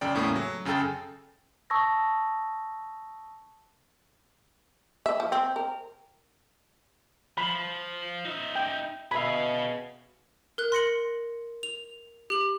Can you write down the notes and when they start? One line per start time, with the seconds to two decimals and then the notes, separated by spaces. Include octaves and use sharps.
0.01 F#2 C#3 D5 G5
0.15 E2 A2 C#3 A3 A#3 C#4
0.36 F#3
0.65 F#2 C#3 G#4 A4 G5 A6
1.70 A5 C#6 D#6 E6 G#6 A#6
5.06 E5
5.20 F3
5.32 C4
5.56 A#4
7.38 F3 B5
8.25 D#4 E5
8.56 G5
9.11 B2 G#4 E5 F5 B5
10.58 A#4 F#6
10.72 C6 A#6 C#7 F#7
11.63 F7
12.30 G4 F#7